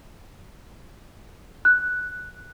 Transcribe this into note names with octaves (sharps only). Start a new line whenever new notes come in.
F#6